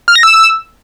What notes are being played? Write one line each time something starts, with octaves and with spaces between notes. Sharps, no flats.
F6
A#6
E6